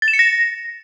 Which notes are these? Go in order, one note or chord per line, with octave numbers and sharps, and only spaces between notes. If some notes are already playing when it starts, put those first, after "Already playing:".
A6
E7
C#7
A#6